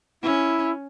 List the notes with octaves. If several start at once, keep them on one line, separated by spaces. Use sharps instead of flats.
C#4 E4